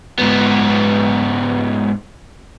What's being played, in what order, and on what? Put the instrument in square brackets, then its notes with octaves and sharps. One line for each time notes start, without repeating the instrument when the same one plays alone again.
[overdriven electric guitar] G#2 B3